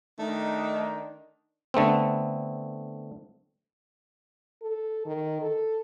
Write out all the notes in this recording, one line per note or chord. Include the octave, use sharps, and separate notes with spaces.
D#3 A3 D4 D#4
D3 A3 B3 C4
A4
D#3
A4